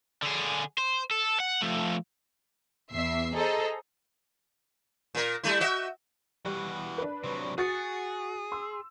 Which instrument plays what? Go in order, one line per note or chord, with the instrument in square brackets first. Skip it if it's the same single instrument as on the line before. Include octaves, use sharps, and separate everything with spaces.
[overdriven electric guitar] D3 G#4
C5
A4
F#5
F3 A3
[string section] E2 E5 C7
G#4 A4 C5 D#5 A#5
[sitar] A#2 A#4
G3 A3 E4
F#4 D#5 E5
[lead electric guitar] E3 F#4 [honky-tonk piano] G3
[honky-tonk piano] D4 B4
[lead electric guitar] C3 F#3
[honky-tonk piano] F#4 A6 C#7 [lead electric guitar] G#4
[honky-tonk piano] C6 E6